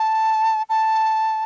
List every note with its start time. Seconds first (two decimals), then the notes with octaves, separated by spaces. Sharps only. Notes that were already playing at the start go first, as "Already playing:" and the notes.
Already playing: A5
0.69 A5